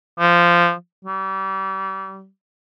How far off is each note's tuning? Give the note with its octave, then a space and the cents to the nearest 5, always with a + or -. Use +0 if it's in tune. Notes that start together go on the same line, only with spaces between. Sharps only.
F3 -10
G3 -35